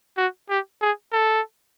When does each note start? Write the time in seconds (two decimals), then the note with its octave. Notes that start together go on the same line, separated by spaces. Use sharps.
0.17 F#4
0.49 G4
0.81 G#4
1.12 A4